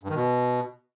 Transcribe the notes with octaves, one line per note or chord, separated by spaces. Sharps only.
G2
D#3
B2